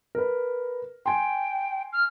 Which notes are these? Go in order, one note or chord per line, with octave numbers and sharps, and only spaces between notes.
A#4 B4
G5 G#5 C6
F6